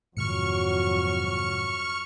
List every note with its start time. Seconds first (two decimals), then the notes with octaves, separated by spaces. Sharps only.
0.17 F2 G#2 C3 D#3 F#3 C#6 F6 C#7